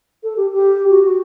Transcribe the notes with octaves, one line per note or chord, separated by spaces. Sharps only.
A4
G4
G4
F#4
F#4